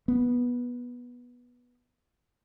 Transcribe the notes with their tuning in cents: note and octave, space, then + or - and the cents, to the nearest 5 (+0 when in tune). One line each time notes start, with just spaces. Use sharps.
B3 -15